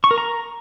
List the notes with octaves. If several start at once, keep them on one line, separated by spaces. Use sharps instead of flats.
C#6
A#4
A#5